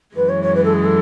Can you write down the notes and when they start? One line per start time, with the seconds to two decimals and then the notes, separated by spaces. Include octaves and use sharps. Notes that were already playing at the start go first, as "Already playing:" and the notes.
0.16 F#2 E3 G#3 B4
0.29 C#5
0.42 C#5
0.55 B4
0.64 A4
0.73 G#4
0.84 A4